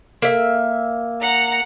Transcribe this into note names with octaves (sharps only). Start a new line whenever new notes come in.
A#3 E5
F#5 A#5